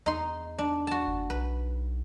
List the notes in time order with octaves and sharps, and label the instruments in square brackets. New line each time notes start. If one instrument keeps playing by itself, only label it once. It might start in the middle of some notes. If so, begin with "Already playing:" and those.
[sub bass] E2 [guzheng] D#4 C6
[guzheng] D4
F#4 A5
[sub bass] F#1
[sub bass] B1 [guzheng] B4